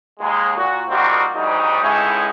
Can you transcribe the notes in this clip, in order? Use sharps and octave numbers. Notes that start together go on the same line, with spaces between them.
D#2 G#3
A#2 F#4
F2 D#3 G3 A#3 C4 F#4
D2 G#2 F#3 G3 D#4
C#2 A2 G#3 C#4 D#4 E4